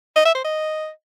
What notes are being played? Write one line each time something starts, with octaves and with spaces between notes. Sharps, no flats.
D#5
E5
C5
D#5